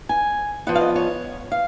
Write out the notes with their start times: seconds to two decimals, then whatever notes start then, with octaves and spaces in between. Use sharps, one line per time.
0.09 G#5
0.67 F3 B3 F#5
0.75 F5
0.81 D#5
0.96 C#5
1.52 F5